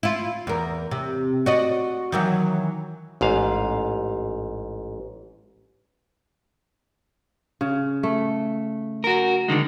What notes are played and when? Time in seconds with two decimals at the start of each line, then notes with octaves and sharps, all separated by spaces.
0.03 E4 F4
0.47 E2 A#4
0.91 C3
1.46 F#4 D5 D#5
2.12 D#3 E3 F#3
3.21 A1 G#2 F5
7.61 C#3
8.03 A3
9.04 F#4 A#4
9.48 D3 D#3 G#3